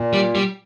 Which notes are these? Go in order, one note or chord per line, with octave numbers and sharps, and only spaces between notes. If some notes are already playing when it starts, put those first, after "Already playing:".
Already playing: A#2
G3
G3